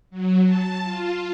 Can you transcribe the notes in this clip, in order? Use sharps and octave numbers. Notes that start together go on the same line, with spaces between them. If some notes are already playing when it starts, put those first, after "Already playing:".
F#3
A5
F4